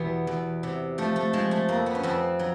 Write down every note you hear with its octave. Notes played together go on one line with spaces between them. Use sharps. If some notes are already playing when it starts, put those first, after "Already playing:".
Already playing: E2 B2 G3 B3
E2
C3
F3 A3
A3
F3 G#3
A3
F2 A#3
B3
C#4
F2 C4
F#3